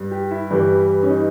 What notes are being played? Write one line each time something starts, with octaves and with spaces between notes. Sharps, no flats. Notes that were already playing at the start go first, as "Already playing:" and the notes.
Already playing: G2 G3
G4
E4
G2 E3 G3
C#4
D#4